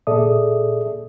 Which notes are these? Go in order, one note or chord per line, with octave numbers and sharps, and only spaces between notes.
A#2 G#4 A4 D5 E5 D#6